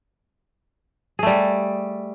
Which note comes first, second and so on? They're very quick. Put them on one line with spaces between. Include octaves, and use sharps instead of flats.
G#4 A3 G3